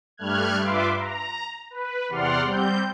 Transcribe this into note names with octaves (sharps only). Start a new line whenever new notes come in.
G2 G3 A3 F6 F#6 G#6
G2 F4 B4 E5 C6 D6
A#5
B4
E2 C3 D5 F#5 C6 F6
G3 C4 G6